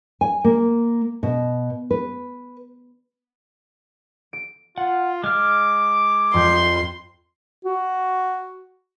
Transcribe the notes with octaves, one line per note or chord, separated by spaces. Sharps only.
G#5
A#3
B2
B4
D7
F4 F#5
G#3 D6 F6
F2 C6 G6
F#4